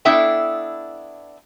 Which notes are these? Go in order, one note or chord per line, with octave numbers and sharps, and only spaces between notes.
B3 D4 E4 A4 E5 G5